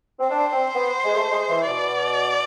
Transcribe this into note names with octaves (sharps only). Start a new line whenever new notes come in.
C4
D4 C5
C4
B3
G#3
A3
G#3
E3
B2 D5